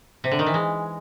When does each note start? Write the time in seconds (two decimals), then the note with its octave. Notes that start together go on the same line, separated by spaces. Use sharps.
0.24 C3
0.31 D3
0.39 D#3
0.46 E3
0.54 G#3